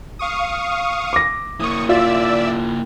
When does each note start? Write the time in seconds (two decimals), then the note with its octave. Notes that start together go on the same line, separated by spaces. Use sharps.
0.19 F5 C#6 D#6
1.13 D6 A#6
1.60 A#3 E4 C#6 D#6
1.89 F4 D5 E5 E6